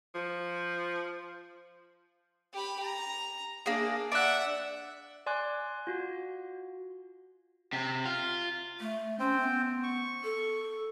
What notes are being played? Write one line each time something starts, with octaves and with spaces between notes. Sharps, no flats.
F3
G4 B5
A#5
A#3 D4 G#4
D5 E5 F#5 F#6
D5 G#5 C6 D6 F#6
F4 F#4
C3
F4
A3
C4 C#4 C5 G5
B3
C#6
A4